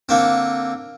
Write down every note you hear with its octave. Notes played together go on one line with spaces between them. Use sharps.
D3 A#3 C4